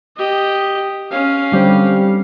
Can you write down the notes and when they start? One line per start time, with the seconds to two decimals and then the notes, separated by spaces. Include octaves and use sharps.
0.16 G4 D#5
1.11 C#4 F5
1.52 D3 G3 C4